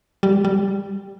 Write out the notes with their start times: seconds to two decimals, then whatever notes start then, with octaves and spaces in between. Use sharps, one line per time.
0.23 G3
0.45 G3